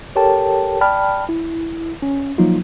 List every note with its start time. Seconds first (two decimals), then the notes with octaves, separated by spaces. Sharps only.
0.16 G4 A4 A#4 C#5 G5 A5
0.81 D5 G5 A5 B5 F6
1.29 E4
2.02 C#4
2.38 F3 F#3 A#3 D#4 F4